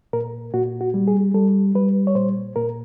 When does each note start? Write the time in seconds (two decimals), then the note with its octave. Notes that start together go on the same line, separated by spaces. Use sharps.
0.13 A#2 A#4
0.54 A#2 F#4
0.81 F#4
0.94 G3
1.08 G#4
1.34 G3 A4
1.75 G3 B4
2.07 C#5
2.15 A#2 C5
2.56 A#2 A#4